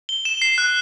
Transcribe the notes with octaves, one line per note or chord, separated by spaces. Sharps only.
G7
E7
C7
F#6